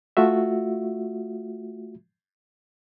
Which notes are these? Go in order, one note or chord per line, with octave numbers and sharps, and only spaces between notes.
A3 F4 F#4 E5